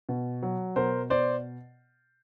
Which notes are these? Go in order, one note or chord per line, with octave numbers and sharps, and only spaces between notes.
B2
F#3
B2 A#4 C5
B2 C5 D5